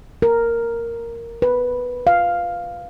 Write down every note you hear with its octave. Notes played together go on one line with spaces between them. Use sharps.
A#4
B4
F5